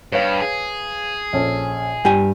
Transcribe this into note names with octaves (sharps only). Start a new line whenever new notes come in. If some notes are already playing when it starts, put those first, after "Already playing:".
G2 B4 C#5 F5
G#4
A#1 C#4 A4
G2 G4 G5 G#5